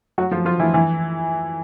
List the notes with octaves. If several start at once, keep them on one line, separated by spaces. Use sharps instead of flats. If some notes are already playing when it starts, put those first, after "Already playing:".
F#3 F#4
F3 F4
F3 F4
E3 E4
E3 E4